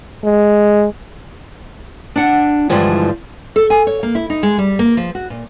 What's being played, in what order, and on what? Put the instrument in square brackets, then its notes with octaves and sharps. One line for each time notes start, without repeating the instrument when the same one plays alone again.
[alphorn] G#3
[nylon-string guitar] D4 F#5
G2 D3 E3 F3 G#3
A4
G#5
C#5
A#3
E4
D#4
G#3
G3
A#3
F3
F#4
A#2